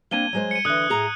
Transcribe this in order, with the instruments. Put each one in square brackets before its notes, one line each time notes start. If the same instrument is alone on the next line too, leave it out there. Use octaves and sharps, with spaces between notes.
[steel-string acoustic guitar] A#3 C4 D4 [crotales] G#6 D#7 G7
[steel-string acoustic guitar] F#3 G#3 C5
[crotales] C#7 D#7
[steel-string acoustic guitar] D3 E3 [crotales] D#6 F#6
[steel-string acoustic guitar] A2 G#4 A#5